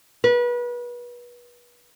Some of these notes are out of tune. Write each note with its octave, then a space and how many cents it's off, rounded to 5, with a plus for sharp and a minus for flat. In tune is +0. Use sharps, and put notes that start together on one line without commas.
B4 -30